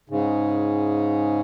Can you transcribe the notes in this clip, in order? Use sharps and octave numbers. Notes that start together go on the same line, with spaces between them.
G#2 C#3